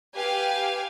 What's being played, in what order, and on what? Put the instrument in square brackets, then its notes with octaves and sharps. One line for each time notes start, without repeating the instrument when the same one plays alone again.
[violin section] G4 B4 F5 G#5